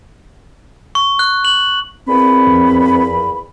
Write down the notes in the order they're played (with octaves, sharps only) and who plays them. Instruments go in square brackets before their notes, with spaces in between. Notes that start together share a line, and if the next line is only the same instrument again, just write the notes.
[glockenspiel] C#6
F#6
F#7
[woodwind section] E2 A#2 B5 [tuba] C4
[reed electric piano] F2